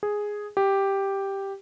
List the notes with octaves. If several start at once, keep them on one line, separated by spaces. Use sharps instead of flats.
G#4
G4